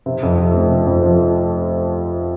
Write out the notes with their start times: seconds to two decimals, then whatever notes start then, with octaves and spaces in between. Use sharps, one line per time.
0.06 C3
0.22 F2
0.38 F3
0.54 F1
0.69 C3
0.86 F2
1.03 F3